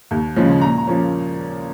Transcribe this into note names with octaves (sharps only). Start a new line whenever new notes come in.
D#2
C#3 F3 G#3 C#4
A#2 A#5
A#5
F3 A#3 C#4